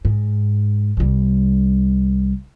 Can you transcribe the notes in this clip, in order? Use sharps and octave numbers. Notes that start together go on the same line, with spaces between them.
G#2
C2 G3